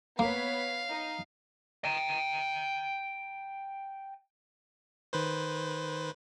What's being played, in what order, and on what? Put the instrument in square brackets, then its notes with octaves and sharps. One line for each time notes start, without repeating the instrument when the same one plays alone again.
[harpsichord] A#3 [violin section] B3 C#5 B6 [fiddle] F5
[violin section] D#4
[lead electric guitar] G5 A#5
[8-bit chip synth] D#3 B4 C5